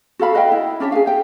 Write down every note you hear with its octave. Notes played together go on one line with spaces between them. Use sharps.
F#4 A4 F5 B5
B4 D#5 F5 G5
E4
C#4 D4 A4 E5
G#4 A#4 F5
G4 G5